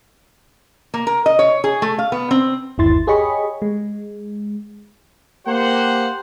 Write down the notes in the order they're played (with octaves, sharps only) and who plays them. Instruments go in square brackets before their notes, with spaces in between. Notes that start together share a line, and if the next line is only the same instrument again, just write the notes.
[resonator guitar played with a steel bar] A#3
A#4
D#5
C#5
G#4
A3
F5
B3
C4
[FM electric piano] G1 D#2 E4 C6 A6
G4 G#4 C#5 D#5 B5 C#6
G#3
[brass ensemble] A#3 G4 C5 F#5